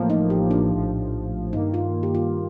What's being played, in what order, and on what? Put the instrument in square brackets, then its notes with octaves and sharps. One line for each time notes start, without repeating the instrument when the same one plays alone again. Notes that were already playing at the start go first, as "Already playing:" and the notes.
Already playing: [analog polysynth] A1 A2 F3 A#3
[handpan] D#4
G4
D4
[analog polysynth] A#1 A2 F3
[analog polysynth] G2 D#3 A#3 [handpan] D#4
[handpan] F4
G4
F4